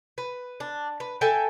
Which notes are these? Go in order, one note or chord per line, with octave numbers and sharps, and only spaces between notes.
B4
D4
B4
A4 E5 G5 G#5